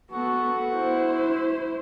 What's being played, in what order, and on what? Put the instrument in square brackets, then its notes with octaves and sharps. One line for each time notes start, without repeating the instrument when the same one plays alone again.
[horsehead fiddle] B3 A4 [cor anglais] F#4
[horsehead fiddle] E4 C5